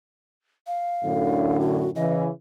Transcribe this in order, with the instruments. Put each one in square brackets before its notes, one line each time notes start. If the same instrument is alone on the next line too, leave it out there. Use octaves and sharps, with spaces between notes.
[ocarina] F5
[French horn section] F#2 A2 D3
[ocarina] F#4
[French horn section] C#3 E3 [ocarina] D#5